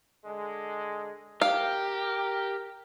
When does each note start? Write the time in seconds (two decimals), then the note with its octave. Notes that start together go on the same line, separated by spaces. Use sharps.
0.26 D3 G#3
1.42 G4 A#4 F5